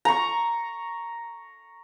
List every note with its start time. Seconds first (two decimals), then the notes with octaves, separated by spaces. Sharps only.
0.05 A#5 C#6